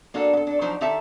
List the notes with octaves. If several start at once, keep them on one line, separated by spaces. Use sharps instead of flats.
A#3 D4 F#4 A4
B3 A4
D4 A4
F3 F#3 D4 D#4 C5
D#3 G4 A4 E5 A5